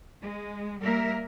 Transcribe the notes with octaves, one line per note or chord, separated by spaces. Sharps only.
G#3
G3 A#3 A#4 E5